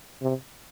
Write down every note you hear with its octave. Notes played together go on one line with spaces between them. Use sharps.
C3